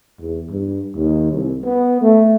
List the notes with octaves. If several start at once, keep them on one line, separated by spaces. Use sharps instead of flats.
E2
G2
D#2
C2
B3
A3